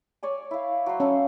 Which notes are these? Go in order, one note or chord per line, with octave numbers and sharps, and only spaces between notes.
C#5 D5 G#5
E4 F5
F#3 C5
C#4 A4 F5